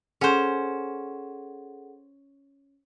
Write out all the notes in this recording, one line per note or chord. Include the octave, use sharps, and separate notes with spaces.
C#4 G#4 A4 C5 F#5